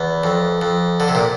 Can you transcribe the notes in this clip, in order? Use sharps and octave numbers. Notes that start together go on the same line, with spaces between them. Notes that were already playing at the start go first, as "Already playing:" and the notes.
Already playing: E2
F2
F2
D3
C3
A#2